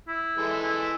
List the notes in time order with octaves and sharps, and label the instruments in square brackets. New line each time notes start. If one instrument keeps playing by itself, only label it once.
[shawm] E4
[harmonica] E3 G#3 A4
[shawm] E4